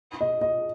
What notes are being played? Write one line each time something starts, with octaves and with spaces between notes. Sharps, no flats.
D#5
D#5